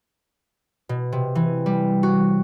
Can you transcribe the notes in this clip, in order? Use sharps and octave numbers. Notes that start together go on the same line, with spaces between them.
B2
C3
E3
G3
F#4